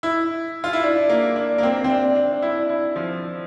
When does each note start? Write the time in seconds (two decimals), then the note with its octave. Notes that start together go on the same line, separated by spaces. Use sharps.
0.03 E4
0.64 F4
0.73 E4
0.83 D4
1.09 A#3
1.36 D4
1.58 A#3
1.63 C4
1.84 C4
1.90 D4
2.16 D4
2.31 D4
2.42 E4
2.58 D4
2.69 E4
2.96 F3